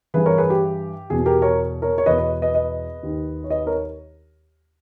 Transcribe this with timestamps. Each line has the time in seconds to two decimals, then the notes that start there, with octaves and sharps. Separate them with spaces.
0.14 G2 E3 G#4 B4
0.26 A#4 C#5
0.38 G#4 B4
0.50 G4
1.10 E2 B2 G#4
1.26 G4 A#4
1.42 A#4 C#5
1.82 A#4 C#5
1.98 C#5
2.06 E2 B2 B4 D#5
2.18 B4 D#5
2.42 B4 D#5
2.54 B4 D#5
3.02 D#2 D#3
3.44 C#5
3.50 B4 D#5
3.67 A#4 C#5